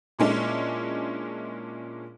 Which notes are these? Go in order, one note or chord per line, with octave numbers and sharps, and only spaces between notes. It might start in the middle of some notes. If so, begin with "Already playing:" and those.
A#2 G#3 C#4 D4 E4